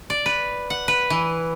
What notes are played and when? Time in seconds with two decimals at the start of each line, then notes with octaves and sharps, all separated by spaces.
0.10 D5
0.26 B4
0.70 F#5
0.88 B4
1.10 E3